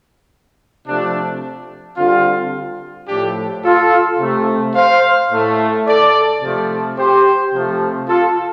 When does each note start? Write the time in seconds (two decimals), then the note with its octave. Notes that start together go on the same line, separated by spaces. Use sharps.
0.86 C3 F3 A3 D4
1.97 D3 G3 C4 F4
3.08 A2 F3 A3 D4 G4
3.63 F4 A4
4.19 C3 A3
4.74 C5 F5
5.31 A2 A3
5.86 A4 D5
6.42 C3 F3 A3
6.97 G4 C5
7.53 C3 F3 A3
8.08 F4 A4